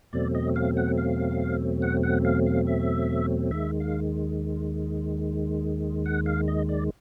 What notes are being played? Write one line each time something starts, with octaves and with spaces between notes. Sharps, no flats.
E2 B2 F#3 A3 C4 D5
D#5
F5
F#5
F5
F#5
F#5
F5
F5
E5
D#2 D#3 G#3 E5
F5
F#5
F5
D#5
D5